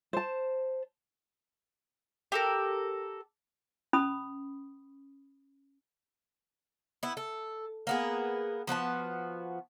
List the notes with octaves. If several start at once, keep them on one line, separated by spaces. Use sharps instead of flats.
C5 A5
G4 A4 A#4
C#4 B5 D#6
B3 E4
A4
A#3 B3 G#4
F3 B3 F#4 A5